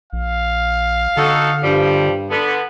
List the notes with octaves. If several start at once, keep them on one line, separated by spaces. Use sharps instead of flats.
A#1 F5
D3 D#4 F#4 A4
G2 F3 G3
D3 B3